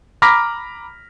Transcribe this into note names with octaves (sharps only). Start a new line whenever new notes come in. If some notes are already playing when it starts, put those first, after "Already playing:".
A#5 B5 D6 F6 A#6 B6